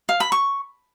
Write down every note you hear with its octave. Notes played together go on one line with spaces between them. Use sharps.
F5
B5
C#6